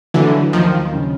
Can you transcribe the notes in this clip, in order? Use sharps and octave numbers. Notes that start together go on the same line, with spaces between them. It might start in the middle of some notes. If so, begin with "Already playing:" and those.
D3 E3 F#3
D#2 D#3 F3
C#3